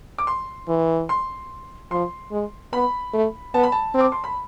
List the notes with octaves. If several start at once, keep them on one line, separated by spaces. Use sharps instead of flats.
D6
C6
E3
C6
F3 C6
G#3
B3 B5
A3
B3 A5
B5
A5
C4
D6
C6
B5